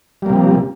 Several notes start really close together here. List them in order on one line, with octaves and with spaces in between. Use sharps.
G3 A#3 C3 F3